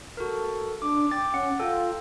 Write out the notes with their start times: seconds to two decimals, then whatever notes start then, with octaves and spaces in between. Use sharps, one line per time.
0.17 F#4 A4 A#4
0.82 D4 D6
1.11 G5 D6 A6
1.34 C#4 F#5
1.60 F4 A4 G5